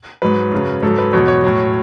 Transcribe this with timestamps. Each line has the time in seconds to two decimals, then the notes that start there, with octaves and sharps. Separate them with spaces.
0.22 G#2 F#3 B4
0.52 F#2 C#3 F#3
0.82 G#2 F#3 A4
0.99 B4
1.13 E2 B2 F#3 C#5
1.28 C#5
1.44 A2 F#3